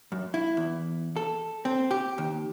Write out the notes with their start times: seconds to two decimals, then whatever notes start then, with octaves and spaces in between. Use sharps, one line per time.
0.12 F#2
0.34 E4
0.57 E2
1.16 A4
1.65 C4
1.91 G4
2.18 D#2